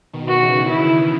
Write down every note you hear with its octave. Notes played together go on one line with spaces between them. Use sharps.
B2 D#3
F#4
C#3 E3
B2 D#3 E4